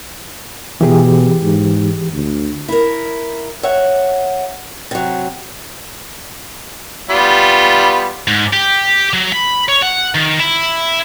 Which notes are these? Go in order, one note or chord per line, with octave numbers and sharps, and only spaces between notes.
B2 E3 G4 G#4
G#2
D2
E4 A#4
C#5 E5 F#5
C3 F#3
G3 B3 F4
G#2
G4
F#3
B5
C#5
F#5
D#3
E4